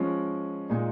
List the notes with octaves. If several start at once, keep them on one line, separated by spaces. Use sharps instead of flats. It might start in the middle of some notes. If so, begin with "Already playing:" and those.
Already playing: F3 G#3 C#4
A#2 G#3 D#4